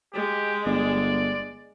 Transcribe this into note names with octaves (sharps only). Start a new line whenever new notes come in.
G#3 G4
G1 D5